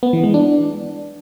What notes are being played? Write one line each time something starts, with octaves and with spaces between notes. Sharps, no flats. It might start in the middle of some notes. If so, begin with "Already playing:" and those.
B3
E3
G#3
D4